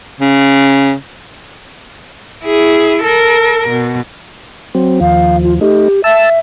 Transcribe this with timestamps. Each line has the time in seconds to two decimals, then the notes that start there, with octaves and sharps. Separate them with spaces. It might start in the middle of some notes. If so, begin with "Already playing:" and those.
0.21 C#3
2.45 E4 G#4
3.03 A4 A#4
3.69 B2
4.75 F#3 C4
5.00 D#2 F3 F5
5.43 F4
5.61 A3 D#4 G4
6.04 E5 A5 E6